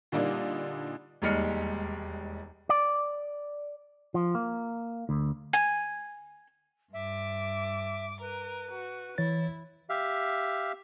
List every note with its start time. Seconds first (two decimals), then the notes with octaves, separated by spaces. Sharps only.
0.12 A#2 D3 G3 A#3 D4 D#4
1.22 E1 D#2 G3 G#3 F6 C#7
2.69 D5
4.14 F3
4.35 A#3
5.09 D2
5.53 G#5
6.93 G2 E5 D6
8.21 A#4 B4
8.70 F#4
9.18 E3 E4 C#5 A6
9.90 G4 E5 F5